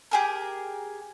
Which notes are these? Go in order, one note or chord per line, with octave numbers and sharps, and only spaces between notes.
G4 G#4 A#4